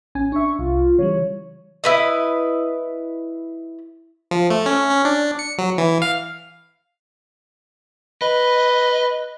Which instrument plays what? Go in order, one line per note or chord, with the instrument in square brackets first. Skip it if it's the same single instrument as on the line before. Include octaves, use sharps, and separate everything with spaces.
[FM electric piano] A1 C#4 G#5
[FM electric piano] D4 E5 [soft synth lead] C#6
[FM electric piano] C2 [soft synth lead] F4
[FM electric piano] C#3 E3 G3 [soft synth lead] C#5
[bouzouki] E4 B4 D#5
[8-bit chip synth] F3
A3
C#4
C#4
D4
C#7
F#3
E3
F5
[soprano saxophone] B4 [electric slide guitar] D#5